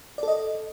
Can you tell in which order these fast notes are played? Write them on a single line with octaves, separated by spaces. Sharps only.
D5 A4 D#5